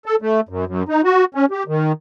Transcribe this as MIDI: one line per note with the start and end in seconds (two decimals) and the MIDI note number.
0.06 0.16 69
0.22 0.40 57
0.49 0.65 42
0.67 0.83 42
0.89 1.01 63
1.04 1.25 66
1.35 1.46 61
1.51 1.63 67
1.68 1.92 51